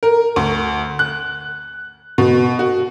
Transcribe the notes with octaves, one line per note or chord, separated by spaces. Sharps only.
A#4
D2
F#6
B2
F#4